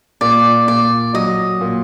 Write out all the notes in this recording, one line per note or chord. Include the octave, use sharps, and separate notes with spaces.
A#2 D5
A#2 D5
F#3 D#5
A#2